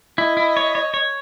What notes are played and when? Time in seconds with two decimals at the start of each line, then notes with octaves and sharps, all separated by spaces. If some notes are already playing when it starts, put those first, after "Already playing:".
0.18 E4 D#5
0.37 E4
0.57 C#5
0.75 C#5
0.94 C#5